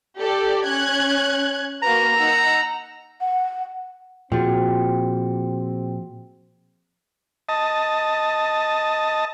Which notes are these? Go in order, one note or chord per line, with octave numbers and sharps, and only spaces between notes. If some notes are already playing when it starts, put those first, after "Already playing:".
G4 A4 D5
C#4 F#6 G#6
A#3 F#4 B4 A#5
D#4 F#5 E6
F#5
A#2 F3 C4 F#4 G#4 G5
D#5 A5